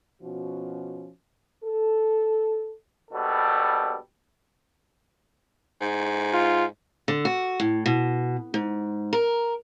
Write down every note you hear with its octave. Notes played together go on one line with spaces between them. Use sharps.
B2 F3 C#4 F#4
A4
A#1 B2 G3 A4
G#2
F4
D3
F#4
A2
B2
G#2
A#4